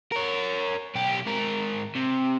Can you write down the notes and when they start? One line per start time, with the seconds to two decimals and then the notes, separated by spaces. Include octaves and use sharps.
0.12 A#4 C#5
0.95 B1 G4
1.26 G#2 A#4
1.95 C3